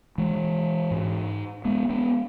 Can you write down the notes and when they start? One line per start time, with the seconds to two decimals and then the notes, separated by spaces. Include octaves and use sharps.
0.18 E3 G#3
0.91 G#2
1.65 G#3 B3
1.90 G#3 B3